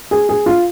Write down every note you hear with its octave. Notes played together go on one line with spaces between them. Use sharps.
G#4
G#4
F4